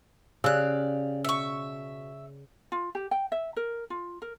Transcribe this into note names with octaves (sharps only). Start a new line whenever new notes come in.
C#3 G4 D5 F5 E6 F#6
B2 E5 C#6
F4
G4
G5
E5
A#4
F4
A#4